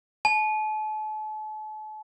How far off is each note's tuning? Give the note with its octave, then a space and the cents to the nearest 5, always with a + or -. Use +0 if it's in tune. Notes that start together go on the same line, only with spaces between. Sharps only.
A5 -40